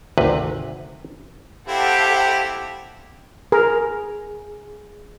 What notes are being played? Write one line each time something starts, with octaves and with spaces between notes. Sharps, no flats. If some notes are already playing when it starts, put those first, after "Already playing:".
G#1 D2 C3 B4
C4 E4 G4 A4 F5 F#5
G#4 A#4